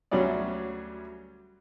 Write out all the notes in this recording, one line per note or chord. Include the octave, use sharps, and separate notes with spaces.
D2 F#3 G3 C#4 D5